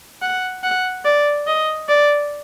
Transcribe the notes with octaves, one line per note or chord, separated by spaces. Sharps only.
F#5
F#5
D5
D#5
D5